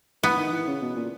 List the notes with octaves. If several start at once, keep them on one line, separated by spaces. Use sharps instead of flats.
E3 B3
D#3
E3
C#3
B2
A#2